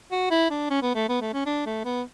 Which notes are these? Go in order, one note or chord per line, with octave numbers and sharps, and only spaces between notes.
F#4
E4
D4
C#4
B3
A3
B3
A3
C#4
D4
A3
B3